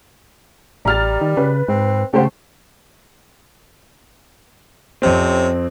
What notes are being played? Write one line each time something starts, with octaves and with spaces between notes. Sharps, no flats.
A1 G3 A#5 F6 A6
D#3
C#3 B4
G#2 C4
C#3 A3 G4 C5 F#5
F2 C3 C4 C#4